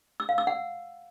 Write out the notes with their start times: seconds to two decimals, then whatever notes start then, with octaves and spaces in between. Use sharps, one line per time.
0.20 E6
0.29 F5
0.38 E6
0.47 F#5